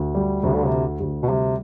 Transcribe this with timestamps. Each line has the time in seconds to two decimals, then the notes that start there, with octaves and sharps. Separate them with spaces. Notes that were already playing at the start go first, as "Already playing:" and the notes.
Already playing: D2
0.15 G3
0.43 D2 C3
0.54 D3
0.65 C3
0.72 D3
1.00 D2
1.23 B2
1.29 C3 G3